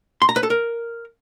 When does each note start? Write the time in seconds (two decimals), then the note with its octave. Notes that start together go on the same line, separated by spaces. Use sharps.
0.22 C6
0.29 A#5
0.36 B4
0.43 A4
0.50 A#4